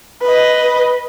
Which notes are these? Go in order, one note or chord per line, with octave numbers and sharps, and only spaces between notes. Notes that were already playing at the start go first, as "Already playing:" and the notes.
B4 D#5